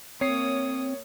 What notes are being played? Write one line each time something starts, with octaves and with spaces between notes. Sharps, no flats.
A#3 C4 C#5 D#6 C7